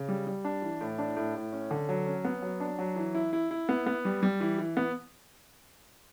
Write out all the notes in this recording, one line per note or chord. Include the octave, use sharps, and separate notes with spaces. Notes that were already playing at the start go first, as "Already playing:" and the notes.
Already playing: C#3
G3
G3
D4
E3
A2
D4
A2
A2
C#4
D3
F#3
C#4
B3
F#3
D4
F#3
E3
E4
E4
E4
B3
B3
G3
G3
E3
E3
B3